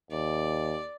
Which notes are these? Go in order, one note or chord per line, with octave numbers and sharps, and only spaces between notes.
D#2 D5